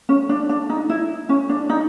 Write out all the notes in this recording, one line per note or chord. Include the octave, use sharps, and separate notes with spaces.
C#4
D4
D4
D#4
E4
C#4
D4
D#4